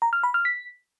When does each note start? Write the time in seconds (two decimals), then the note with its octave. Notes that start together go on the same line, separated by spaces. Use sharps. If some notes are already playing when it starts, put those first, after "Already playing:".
0.02 A#5
0.13 F6
0.23 B5
0.34 F6
0.45 B6